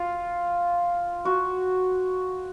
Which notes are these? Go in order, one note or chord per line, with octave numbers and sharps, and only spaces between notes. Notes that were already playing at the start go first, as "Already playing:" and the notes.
Already playing: F4
F#4